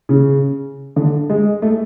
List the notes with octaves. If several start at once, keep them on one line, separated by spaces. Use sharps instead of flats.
C#3
D3
G#3
A3